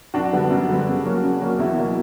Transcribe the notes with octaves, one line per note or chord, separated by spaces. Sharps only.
F#2 D4 F#4
D3 G3 B3
F#2
D3 G3 B3
C#3
F#3 A#3 C#4
C#3
F#3 A#3 C#4
E2 E4
B2 F#3 A#3